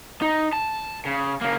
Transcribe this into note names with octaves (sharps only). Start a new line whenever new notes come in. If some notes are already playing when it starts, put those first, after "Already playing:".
D#4
A5
C#3
C#3 A#3